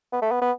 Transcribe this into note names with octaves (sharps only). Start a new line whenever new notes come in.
B3
A3
B3
B3